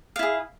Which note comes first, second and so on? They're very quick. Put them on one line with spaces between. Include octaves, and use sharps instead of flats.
F5 E4 G#4